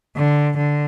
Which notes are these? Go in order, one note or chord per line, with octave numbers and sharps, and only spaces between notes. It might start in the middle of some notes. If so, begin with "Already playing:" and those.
D3
D3